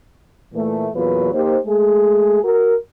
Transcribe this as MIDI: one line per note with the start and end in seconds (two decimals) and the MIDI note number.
0.53 0.88 46
0.53 0.88 52
0.53 0.88 57
0.95 1.32 40
0.95 1.32 46
0.95 1.32 54
0.95 1.32 65
0.95 1.32 71
1.33 1.57 58
1.33 1.57 63
1.33 1.57 67
1.33 1.57 72
1.67 2.40 56
1.67 2.40 57
1.67 2.40 68
2.44 2.75 66
2.44 2.75 70